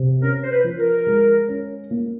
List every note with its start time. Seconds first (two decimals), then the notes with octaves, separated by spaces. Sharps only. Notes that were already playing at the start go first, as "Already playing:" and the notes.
Already playing: C3
0.21 C#4 A#4
0.43 C5
0.50 B4
0.64 F3
0.78 A#4
1.07 G#3
1.48 C#4
1.91 A#3